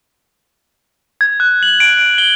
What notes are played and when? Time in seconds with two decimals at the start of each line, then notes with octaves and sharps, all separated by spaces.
1.21 G#6
1.40 F#6
1.63 F#7
1.80 D7
1.97 D7
2.18 G7